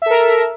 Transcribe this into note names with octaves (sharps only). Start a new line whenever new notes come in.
A4 A#4 E5